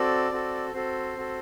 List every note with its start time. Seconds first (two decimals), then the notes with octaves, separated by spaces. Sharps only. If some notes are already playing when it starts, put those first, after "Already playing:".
Already playing: C4 F#4 A4 D5
0.32 C4 F#4 A4
0.73 C4 F#4 A4 C5
1.16 C4 F#4 A4